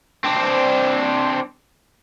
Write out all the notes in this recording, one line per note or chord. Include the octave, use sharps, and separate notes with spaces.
C4 D4